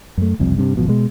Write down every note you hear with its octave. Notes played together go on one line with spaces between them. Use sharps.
F#2 A3
F#1 C2 F2
G2 C3
G#1 B2 F3
B2 G#3